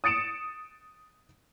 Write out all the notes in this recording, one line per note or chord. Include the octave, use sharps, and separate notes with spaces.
D#6 A6 C#7 D7 E7